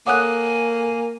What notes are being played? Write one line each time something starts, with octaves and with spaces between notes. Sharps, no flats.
A#3 A4 C#5 F#5 G#5 D6 D#6 F#6